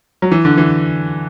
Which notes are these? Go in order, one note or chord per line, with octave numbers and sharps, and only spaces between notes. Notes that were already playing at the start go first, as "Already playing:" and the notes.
F#3
E3
D3
E3